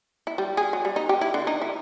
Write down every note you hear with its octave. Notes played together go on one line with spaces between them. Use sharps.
E4
G3
G#4
F#3
G3
D#4
G4
E4
D3
D#4
E4